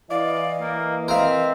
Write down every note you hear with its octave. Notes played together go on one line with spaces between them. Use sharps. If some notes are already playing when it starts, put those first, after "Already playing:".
E3 D5 D#5 F5
A#3
C4 A#4 E5 F5